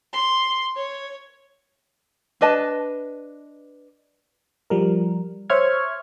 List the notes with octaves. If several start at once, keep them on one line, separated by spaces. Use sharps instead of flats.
C6
C#5
D4 B4 D#5 A5
F3 G3 A#4
C5 C#5 E5 C#6 F6 G#6